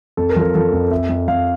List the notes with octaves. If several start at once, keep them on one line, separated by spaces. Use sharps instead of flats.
F2 A4
A#4
F3 A4
F3 A4
F2
F2 E5
F2
F2 F5